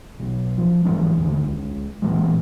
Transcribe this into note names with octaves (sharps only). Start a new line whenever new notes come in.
B1
F3
B1 G#2 E3 D4
D#2 D3
C#2
A#2 E3 G#3